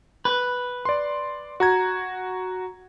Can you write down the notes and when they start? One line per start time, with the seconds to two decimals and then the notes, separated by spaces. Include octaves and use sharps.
0.25 B4
0.85 D5 C6
1.60 F#4 A#5 G#6